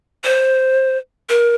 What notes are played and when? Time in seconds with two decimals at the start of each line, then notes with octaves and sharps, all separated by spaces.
0.24 C5
1.29 A#4